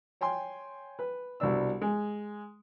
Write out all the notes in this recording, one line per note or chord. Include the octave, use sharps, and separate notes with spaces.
C#5 G5 G#5 C6
B4
C2 B2 D4 E6
G#3